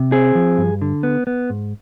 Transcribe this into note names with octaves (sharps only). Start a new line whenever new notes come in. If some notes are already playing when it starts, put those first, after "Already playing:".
Already playing: C3
C4 G#4
F3
G2
D3
B3
B3
G#2